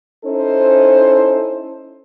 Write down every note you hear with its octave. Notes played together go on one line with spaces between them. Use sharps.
C#4 D#4 E4 A4 C5